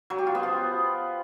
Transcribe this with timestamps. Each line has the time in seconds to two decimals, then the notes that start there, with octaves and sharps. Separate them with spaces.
0.10 F#3
0.18 G4
0.27 F4
0.35 B3
0.43 F3